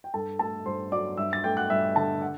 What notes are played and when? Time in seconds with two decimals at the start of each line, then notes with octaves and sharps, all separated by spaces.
0.04 G5
0.14 G2 A4 A5
0.39 A3 A4 A5
0.66 G2 C5 C6
0.92 F#3 D5 D6
1.17 G2 E5 E6
1.33 A6
1.44 A3 G5 G6
1.57 F#5 F#6
1.70 G2 E5 E6
1.96 D3 A4 A5
2.22 F#5